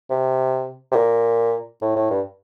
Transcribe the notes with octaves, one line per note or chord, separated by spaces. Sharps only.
C3
C3
A#2
A2
A2
G2